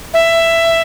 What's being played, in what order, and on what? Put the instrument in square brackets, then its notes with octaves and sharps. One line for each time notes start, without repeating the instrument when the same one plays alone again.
[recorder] E5